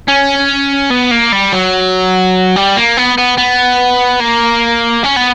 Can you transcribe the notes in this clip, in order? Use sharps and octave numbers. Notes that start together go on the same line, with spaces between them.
C#4
B3
A#3
G3
F#3
G3
A#3
B3
B3
B3
A#3
C#4
B3